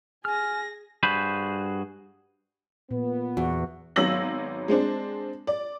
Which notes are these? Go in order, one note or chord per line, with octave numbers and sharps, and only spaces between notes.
G#4 G#5 F6 A#6
G2 F#4 G#4 C5 B5
A#2 B3
E2 F#4
G#1 F#3 B3 E6 A#6 F#7
G#3 C4 D4 C5
D5